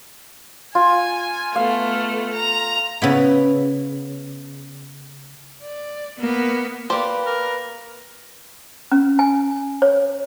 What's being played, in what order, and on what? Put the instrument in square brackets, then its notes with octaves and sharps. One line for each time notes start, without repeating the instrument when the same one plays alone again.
[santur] F4 [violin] G#5
[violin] A3 B3 [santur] F5
[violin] A#5
[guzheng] C#3 B3 E4
[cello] D5
A#3 B3
[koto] A#3 G4 [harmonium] B4 [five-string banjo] C5 D5
[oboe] A#4
[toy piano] C#4
G#5
C#5